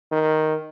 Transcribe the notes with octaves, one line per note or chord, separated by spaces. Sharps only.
D#3